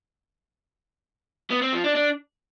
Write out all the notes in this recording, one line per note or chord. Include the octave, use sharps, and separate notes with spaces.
B3
C4
F3
D4
D4